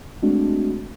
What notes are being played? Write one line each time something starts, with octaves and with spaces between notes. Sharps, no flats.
G#3 A3 C4 D4 F#4